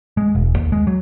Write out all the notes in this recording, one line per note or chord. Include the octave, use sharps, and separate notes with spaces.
G#3
E1
D#2
G#3
F#3